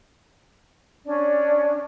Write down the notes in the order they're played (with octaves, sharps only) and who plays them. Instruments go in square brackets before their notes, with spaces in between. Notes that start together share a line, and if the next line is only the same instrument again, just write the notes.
[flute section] C#4 D4 D5